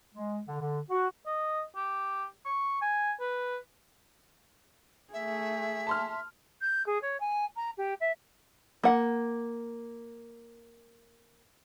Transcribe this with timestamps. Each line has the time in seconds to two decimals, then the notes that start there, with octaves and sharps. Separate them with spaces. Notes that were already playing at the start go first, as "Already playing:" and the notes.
0.15 G#3
0.48 D3
0.60 D3
0.90 F#4
1.27 D#5
1.76 G4
2.46 C#6
2.82 G#5
3.20 B4
5.13 A3 G#4 E5
5.87 A5 C6 F6
6.61 G6
6.86 G#4
7.01 C#5
7.20 G#5
7.56 A#5
7.77 G4
8.00 E5
8.83 A#3 F#5